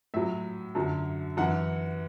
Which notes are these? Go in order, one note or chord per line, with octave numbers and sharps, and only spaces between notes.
A2 F#3 E5
F#2 D3 F#3
F#2 E3 F#5